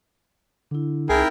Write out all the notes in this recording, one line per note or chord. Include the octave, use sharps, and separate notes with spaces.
D3 D4 E4
C2 C4 D#4 E4 G#4 A#4 G5